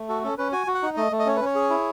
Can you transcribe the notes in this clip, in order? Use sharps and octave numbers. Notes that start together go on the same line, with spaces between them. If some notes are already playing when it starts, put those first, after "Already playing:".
Already playing: A3
F#4 A4
C#4 A4
C#4 B4
F#4 G#5
F#4
F#5
D#4
A3 D#5
A3
D#5
C#4 C#5
B4
C#4
C#5
G#4
E4